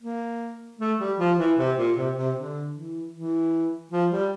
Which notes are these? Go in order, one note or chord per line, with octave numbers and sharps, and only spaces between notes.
A#3
A3
G3
F3
E3
C3
A#2
C3
C3
D3
E3
E3
F3
G3